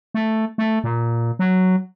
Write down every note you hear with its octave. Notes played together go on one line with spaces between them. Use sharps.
A3
A3
A#2
F#3